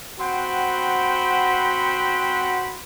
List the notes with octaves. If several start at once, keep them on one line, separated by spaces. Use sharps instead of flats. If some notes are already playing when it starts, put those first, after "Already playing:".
C4 F#4 C5 F#5 G5 B5